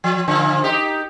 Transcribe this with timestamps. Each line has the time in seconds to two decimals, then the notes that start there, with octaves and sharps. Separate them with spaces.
0.04 F3
0.28 A#2 D3 F3
0.64 D#4 G4